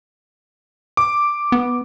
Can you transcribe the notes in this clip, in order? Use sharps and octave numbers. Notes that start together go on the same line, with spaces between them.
D6
B3